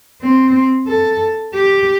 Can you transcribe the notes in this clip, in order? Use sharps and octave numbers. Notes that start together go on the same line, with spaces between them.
C4
A4
G4